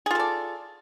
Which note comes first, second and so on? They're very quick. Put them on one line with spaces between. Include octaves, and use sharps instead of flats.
G#4 F4 A4 D5